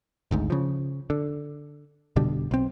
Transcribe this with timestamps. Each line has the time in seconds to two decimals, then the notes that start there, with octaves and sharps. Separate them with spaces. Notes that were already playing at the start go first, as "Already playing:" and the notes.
0.31 G#1 D2 G#2
0.50 C#3 F3
1.10 D3
2.16 F1 B2 D3 G3
2.51 B1 C4